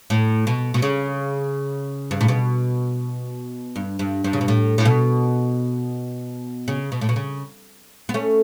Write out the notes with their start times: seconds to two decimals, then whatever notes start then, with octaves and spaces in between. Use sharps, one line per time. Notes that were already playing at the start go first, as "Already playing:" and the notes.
0.10 A2
0.47 B2
0.74 B2
0.82 C#3
2.11 G2
2.21 A2
2.28 B2
3.76 G2
3.99 G2
4.24 G2
4.33 C#3
4.41 B2
4.48 A2
4.78 A2
4.85 B2
6.68 C#3
6.92 B2
7.01 A2
7.09 B2
7.16 C#3
8.09 B3
8.14 A3 C#4